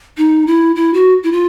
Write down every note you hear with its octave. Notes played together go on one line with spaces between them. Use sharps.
D#4
E4
E4
F#4
E4
F4